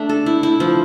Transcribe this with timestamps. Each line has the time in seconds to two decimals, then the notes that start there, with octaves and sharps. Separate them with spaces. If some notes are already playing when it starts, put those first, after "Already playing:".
Already playing: A3 D4
0.09 A4
0.26 E4
0.43 E4
0.60 F3